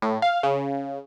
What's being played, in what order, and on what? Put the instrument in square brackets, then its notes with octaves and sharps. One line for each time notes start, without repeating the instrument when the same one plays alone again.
[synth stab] A2
F5
C#3